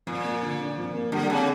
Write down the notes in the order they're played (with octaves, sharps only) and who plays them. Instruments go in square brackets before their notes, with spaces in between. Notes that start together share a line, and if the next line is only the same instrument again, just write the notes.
[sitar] A#2 [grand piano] F3
[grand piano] A#3
D3
D4
F3
A#3
[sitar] D3 [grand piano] G3
[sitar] C#3 [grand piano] C4